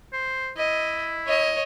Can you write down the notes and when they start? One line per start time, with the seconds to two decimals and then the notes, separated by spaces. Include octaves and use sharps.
0.13 C5
0.57 E4 D#5
1.27 C#5 D#5